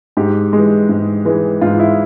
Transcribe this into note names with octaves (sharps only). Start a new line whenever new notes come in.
G#2 G4
E3 G#3
G#2
E3 G#3
G#2 F4
E4